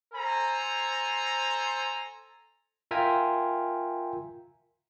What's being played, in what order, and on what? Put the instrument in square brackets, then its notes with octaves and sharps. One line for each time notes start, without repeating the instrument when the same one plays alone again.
[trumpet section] A4 C5 G#5 A#5
[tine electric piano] F4 A#4 E5 G5 G#5 A#5